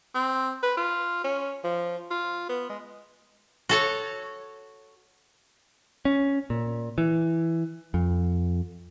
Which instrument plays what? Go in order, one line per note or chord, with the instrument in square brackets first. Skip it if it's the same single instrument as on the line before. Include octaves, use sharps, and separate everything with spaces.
[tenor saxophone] C4
B4
F4
C#4
F3
F4
B3
G#3
[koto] F#4 A4 C#5
[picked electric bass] C#4
A#2
E3
F2